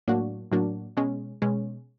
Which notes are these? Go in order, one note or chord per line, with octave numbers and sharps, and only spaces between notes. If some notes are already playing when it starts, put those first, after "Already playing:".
A2 F#3 A#3 D4 F#4
A2 F#3 A#3 D4 F#4
B2 G#3 C#4
B2 G#3 C#4